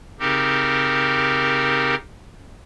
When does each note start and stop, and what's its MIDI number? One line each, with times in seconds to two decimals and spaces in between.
0.19 1.95 49
0.19 1.95 60
0.19 1.95 63
0.19 1.95 67
0.19 1.95 70